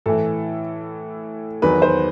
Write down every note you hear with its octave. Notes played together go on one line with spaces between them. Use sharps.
A2 E3 A4
E2 D#3 F#3 B4
C5